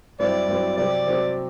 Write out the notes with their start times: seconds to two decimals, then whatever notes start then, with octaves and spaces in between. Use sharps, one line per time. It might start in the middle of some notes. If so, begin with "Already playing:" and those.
0.19 G2 F#3 C4 E4 D5
0.49 G2 F#3 C4 E4
0.77 C3 F#3 C4 G4 D5
1.06 C3 F#3 C4 G4